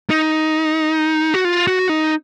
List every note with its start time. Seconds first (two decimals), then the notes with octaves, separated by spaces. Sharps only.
0.10 D#4
1.34 F#4
1.45 F4
1.67 F#4
1.89 D#4